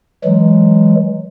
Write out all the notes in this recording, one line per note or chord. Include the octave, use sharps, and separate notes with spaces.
E3 F#3 G#3